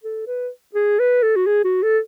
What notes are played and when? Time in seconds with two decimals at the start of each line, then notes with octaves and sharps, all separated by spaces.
0.04 A4
0.27 B4
0.75 G#4
0.99 B4
1.23 A4
1.36 F#4
1.46 G#4
1.64 F#4
1.83 A4